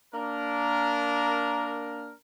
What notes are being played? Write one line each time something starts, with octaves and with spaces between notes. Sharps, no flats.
A#3 D4 A#4